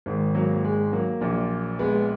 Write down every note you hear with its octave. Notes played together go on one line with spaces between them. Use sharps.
G#1 G#2 D#3
F#3 A#3
G#3
F#3 A#3
A#1 A#2
G#3 B3